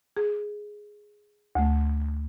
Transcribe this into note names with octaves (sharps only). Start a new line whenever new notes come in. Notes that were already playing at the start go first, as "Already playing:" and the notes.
G#4
D2 A3